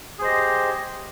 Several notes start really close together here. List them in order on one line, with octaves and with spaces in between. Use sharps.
G#4 C5 D#5 G4